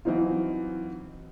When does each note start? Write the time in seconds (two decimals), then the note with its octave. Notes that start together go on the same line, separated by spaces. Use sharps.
0.05 E3 F#3 C4 D#4 F4